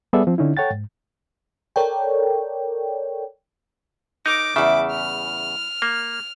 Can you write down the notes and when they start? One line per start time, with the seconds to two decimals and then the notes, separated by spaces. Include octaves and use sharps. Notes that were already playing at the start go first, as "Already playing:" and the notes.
0.13 G3 B3 G#4 A4 D5 E5
0.27 F3 C4
0.38 D3 C#4 D#4 E4
0.57 A4 C#5 F#5 G5 A6
0.71 G#2
1.76 A4 A#4 C#5 D5 G5
4.26 D#4 A#4 D6
4.56 E2 C#3 G3 E4 E5
4.91 F6
5.82 A#3